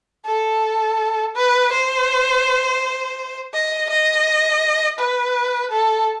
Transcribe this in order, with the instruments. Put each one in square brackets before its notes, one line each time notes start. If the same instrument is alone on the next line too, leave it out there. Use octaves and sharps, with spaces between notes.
[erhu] A4
B4
C5
D#5
D#5
B4
A4